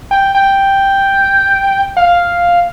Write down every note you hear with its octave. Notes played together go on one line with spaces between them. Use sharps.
G5
G5
F5